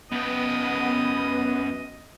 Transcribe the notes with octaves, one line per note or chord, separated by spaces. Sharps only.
F#2 B3 D#5 G5